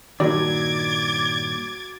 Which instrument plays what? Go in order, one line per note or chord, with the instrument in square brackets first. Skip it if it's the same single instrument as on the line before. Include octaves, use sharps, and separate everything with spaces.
[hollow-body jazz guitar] G2 A#2 D#3 [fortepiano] F#3 [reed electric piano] D5 [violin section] D6 G#6 A6